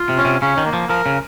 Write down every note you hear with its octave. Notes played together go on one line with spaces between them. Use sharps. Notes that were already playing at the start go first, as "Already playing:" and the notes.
Already playing: F4
C3
C#4
C3
C#3 C#4
D#3
A#3
F3
F3 A#4
C#3